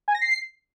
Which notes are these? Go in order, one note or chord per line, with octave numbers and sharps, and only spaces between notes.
G#5
A#6
C7